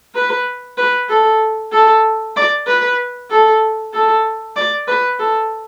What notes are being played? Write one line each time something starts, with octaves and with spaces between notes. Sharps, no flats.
B4
B4
A4
A4
D5
B4
A4
A4
D5
B4
A4